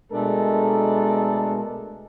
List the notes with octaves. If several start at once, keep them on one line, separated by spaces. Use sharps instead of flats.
B2 G#3 A3 D4 A4 A#4